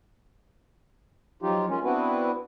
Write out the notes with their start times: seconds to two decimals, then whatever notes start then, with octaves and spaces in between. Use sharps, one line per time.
1.43 F3 F#3 D#4 F4 G4
1.69 G#3 A#3 C#4 F4
1.84 B3 C4 D4 E4 F#4 B4